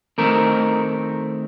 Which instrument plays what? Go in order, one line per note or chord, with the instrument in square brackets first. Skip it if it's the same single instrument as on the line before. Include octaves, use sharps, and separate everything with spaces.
[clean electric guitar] D#3 A3 C4 A#4